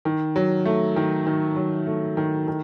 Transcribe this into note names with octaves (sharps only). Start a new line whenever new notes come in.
D#3
F#3
A3
D#3
D#3
F#3
A3
D#3
D#3